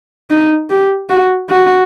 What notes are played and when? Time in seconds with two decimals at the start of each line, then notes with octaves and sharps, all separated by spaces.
0.30 D#4
0.70 G4
1.10 F#4
1.50 F#4